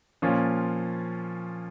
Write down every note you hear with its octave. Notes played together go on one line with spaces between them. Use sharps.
A#2 F3 C#4 F4